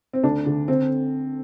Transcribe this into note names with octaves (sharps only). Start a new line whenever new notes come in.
C4
D2 D4
D3
D3 C4